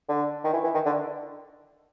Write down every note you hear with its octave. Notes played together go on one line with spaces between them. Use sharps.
D3
D#3
E3
E3
D#3
D3